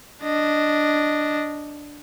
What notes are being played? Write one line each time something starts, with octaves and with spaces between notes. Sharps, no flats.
D4 D#5